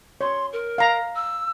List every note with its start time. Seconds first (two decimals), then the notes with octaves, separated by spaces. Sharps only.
0.21 C#5 C6
0.52 A#4
0.78 F5 A#5
1.15 E6